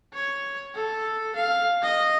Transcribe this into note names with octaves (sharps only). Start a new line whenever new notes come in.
C#5
A4
F5
D#5